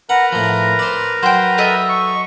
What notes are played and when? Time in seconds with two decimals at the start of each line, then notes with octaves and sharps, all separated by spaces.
0.09 A#4 B4 F#5 A#5
0.32 A2 F3
0.79 C5 D5
1.23 F#3 C5 G5
1.58 A4 D#5 E5
1.89 C#6